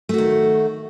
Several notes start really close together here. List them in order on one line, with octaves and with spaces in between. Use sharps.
A3 F#4 D#3